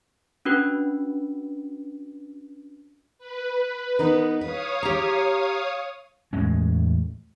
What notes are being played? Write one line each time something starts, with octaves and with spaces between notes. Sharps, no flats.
C#4 D4 F#4 B4
B4
B3 D#4 A#4
B4 C#5 F5 D#6
G4 A#5
E2 A2 G#3 C#4